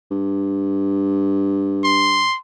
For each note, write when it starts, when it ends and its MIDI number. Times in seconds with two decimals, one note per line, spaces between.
0.11 2.28 43
1.84 2.37 84